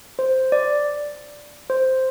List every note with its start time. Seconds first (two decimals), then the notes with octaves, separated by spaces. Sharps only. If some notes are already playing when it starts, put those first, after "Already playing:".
0.19 C5
0.52 D5
1.70 C5